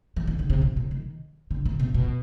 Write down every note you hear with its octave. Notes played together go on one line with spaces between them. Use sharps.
E3
D#3
D3
C3
B2
C3
D#3
D3
C3
B2
B2